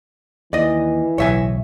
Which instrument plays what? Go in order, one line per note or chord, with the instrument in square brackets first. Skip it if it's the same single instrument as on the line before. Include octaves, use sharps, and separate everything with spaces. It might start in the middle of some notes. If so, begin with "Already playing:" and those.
[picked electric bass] D#2 [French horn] E3 [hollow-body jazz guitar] D5 D#5
[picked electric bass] D1 B1 [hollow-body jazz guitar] C#5 E5 G#5